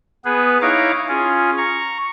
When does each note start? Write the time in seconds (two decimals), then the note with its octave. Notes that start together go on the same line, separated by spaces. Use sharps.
0.25 B3 G#4 B4
0.62 D#4 E4 C#5 F5 A#5 D6
1.08 C#4 F4 G#4
1.58 A#5 C#6